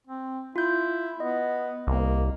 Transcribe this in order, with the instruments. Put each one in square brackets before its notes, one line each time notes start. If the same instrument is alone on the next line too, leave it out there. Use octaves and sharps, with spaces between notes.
[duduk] C4
[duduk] E4 [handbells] F4 G6
[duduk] B3 [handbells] D#5
[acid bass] C2 [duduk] A#3